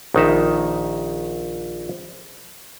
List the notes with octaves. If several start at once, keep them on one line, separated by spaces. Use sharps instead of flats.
A#1 D#3 D#4 E5